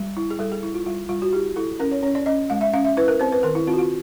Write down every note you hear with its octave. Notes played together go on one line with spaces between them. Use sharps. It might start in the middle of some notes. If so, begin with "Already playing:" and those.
Already playing: G3
E4
G#4
G3 A4
G#4
E4
F4
G3 F4
G3 F4
F#4
E4 G4
E4 A4
C#4 A#4
C#5
C#4 C#5
D5
C#4 D#5
G#3 F5
E5
C#4 F5
E5
E4 B4
A#4
C4 C5
B4
D#3 A#4
E4
C4 F4
F#4
F4